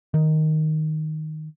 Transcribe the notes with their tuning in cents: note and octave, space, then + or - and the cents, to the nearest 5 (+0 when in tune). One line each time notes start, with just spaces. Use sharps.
D#3 +0